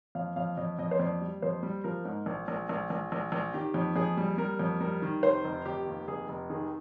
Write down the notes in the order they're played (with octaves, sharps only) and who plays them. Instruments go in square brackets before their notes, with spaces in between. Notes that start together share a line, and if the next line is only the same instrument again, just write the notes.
[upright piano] F2 F5
F2 F5
F2 D#5
F2 D#5
C5
F2 D5
G3
F2 C5
G3
F3 A#4
G#2
A#1
A#1
A#1
A#1
A#1
A#1
D#3 G4
F2
F2 G#4
G3
G3 A#4
F2
G3 A#4
D#3
F1 C5
F1
F1 G4
D#2
F1 G#4
F1
D#3 G#4